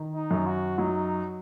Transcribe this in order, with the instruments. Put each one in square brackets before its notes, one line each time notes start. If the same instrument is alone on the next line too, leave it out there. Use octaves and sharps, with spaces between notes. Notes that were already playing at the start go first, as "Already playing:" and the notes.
Already playing: [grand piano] D#3
[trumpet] D#4
[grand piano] F#2
[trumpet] F#4
[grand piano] F#3 [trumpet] D#4